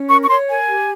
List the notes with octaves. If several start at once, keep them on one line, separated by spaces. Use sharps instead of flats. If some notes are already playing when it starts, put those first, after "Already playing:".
Already playing: C#4
A#4 C#6
C#6
C#5 C6
A#4 G#5
G4